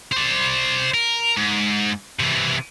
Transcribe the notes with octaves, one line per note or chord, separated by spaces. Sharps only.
C5 D5
A#4
G#2
C3 E3